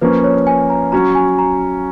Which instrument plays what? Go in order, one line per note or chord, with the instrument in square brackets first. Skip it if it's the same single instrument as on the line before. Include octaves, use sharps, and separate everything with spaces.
[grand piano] F3 A#3 C#4 [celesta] B4
[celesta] C#5
G#5
A#5
[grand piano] F#3 C#4 F#4 [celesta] A#5
[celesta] G#5
A#5